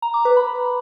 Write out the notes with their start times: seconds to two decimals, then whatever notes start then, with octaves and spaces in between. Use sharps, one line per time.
0.02 A#5
0.14 D6
0.25 B4
0.37 B5